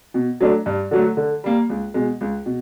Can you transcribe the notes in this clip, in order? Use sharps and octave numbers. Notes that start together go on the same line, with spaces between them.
B2
F#3 A3 D4
G2
D3 F#3 A3
D3
G3 A#3
C#2
B2 G#3
C#2
B2